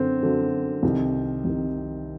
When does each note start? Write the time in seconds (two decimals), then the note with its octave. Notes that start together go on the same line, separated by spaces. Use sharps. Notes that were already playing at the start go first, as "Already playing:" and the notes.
Already playing: F#2 D3 C4
0.23 F#2 D3
0.83 C2 C3 D#3
1.45 C2 C3 D#3